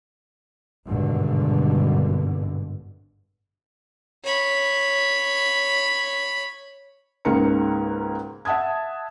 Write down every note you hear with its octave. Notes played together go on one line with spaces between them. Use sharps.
G#1 G2 B2 D3
C#5 B5
C#2 G#2 C#3 A#3 A#4 C#7
E5 F#5 A5 D#6 G#6